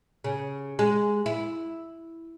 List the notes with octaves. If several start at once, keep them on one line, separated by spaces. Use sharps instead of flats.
C#3
G#3
E4